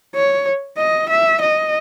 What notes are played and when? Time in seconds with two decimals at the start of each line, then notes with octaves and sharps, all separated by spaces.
0.14 C#5
0.77 D#5
1.09 E5
1.41 D#5